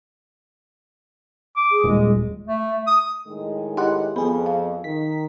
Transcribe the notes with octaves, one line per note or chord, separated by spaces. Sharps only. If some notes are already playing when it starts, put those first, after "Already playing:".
D6
G#4
D#1 G#3
A3
D#6
A2 D#3 G#3
E4 G4 D#5 F#5 C6
F2 B3 G#4 B5
F5
D#3 B6